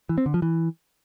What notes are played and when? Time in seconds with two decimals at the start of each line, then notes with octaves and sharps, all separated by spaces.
0.09 E3
0.18 C4
0.26 D3
0.34 F3
0.42 E3